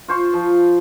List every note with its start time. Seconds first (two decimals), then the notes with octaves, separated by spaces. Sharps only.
0.08 F4 C5 C#6
0.33 F3